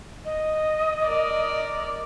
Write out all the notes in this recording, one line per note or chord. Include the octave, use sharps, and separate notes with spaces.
D#5
A#4 D5